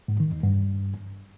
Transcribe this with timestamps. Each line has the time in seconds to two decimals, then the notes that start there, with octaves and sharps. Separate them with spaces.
0.08 G#2
0.20 D#3
0.32 E2
0.43 G2